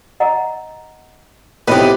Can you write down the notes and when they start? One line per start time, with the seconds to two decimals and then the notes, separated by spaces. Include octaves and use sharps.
0.20 D#5 F#5 A#5
1.68 A2 C3 B3 D#4 G4 B4